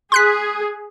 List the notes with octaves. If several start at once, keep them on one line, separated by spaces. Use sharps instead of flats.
G#4 C6 F#6 B6